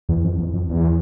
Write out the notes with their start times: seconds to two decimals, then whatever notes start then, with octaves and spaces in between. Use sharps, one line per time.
0.09 E2
0.24 F2
0.39 E2
0.54 F2
0.69 E2